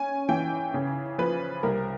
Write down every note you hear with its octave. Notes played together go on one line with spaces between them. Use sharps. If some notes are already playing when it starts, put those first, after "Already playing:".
Already playing: C#4 G#5
E3 G5
C#3
F3 B4
C2 A#4